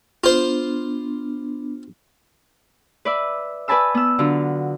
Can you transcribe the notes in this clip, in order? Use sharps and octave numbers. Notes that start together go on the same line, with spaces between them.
B3 D4 F4 C5
B4 D5 E5
B4 D5 G#5 A5 B5 E6
B3 E6
D3 F#3 F4